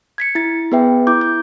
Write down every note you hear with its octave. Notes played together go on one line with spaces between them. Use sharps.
G#6 B6 C#7
E4 A6
B3 G#4 B4 E5 G5
E4 D6 G6
G6